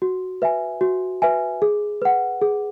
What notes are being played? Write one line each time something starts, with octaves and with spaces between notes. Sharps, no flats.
F#4
B4 E5 G#5
F#4
B4 E5 G#5
G#4
B4 F#5
G#4